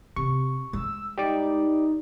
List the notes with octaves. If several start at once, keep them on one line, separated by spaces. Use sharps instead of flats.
C3 C#6
G#3 E6
D#4 G4 D5 D6